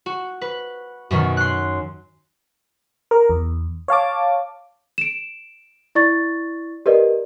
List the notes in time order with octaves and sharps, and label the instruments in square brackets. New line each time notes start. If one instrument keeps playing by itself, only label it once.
[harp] F#4
B4
F#2 B2 D#3
C6 F#6
[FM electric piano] A#4
E2
C#5 F5 A5 D6
[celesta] D7 E7
E4 D5 C#6 A6
G4 A#4 B4 D5 D#5